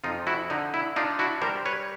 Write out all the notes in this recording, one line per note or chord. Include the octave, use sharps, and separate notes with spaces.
F2 D#4 F4
E4 F#4
D3 D#4
E4
D4 D#4 F4
E4 F#4
G3 A#4 C5
B4 C#5